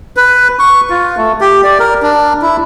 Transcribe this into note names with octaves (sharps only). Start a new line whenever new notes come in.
B4
C#6
F4
A3
G4
D5
A#4
D4
E4